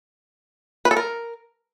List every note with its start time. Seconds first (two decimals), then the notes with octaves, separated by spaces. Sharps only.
0.85 B4
0.91 A4
0.97 A#4